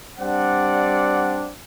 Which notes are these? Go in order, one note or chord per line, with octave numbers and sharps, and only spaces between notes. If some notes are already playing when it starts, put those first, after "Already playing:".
G3 C4 D4 D5 F#5